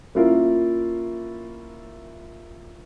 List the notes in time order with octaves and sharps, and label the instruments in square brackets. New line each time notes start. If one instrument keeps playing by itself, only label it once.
[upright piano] A#3 C#4 E4 F4 A#4